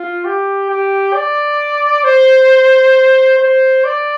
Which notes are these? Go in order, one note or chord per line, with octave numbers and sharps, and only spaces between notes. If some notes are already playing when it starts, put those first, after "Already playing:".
Already playing: F4
G4
G4
D5
C5
C5
D5